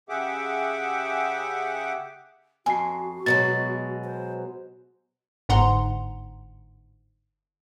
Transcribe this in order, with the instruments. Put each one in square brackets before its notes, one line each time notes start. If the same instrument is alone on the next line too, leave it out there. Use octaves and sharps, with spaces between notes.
[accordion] C#3 G4 G#4 E5 F#5 D6
[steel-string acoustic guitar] F2 [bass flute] F#4 [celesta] G#5 C7
[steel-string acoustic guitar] B2 F#3 G#3 [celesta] A6
[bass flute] C5
[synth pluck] G1 G#2 F#5 A#5 C6